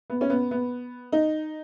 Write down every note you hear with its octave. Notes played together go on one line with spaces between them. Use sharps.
B3
C#4
B3
B3
D#4